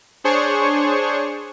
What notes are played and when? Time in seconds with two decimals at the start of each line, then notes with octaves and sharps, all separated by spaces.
0.24 D4 G#4 C5 C#5 C#6